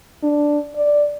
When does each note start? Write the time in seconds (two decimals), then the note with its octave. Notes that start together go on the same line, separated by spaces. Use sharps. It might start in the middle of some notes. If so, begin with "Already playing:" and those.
0.23 D4
0.76 D5